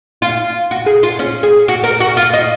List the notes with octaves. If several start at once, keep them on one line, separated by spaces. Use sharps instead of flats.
F4
F#4
G#4
F4
C#4
G#4
F#4
A#4
F#4
F4
D#4